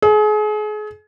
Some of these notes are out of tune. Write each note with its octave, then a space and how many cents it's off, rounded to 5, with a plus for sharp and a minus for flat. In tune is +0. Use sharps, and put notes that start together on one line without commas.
G#4 +35